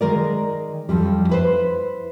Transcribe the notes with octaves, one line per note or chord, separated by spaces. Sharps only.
D#3 G#3 A#4 D5
F2 F3 G3
E4 B4 C5